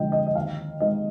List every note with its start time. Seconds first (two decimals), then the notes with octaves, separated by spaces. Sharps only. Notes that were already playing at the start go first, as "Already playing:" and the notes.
Already playing: F2 D3 F3 G#3 D#5 G5
0.12 D#5
0.27 D#5
0.35 D#2 F5
0.80 D#3 G#3 D#5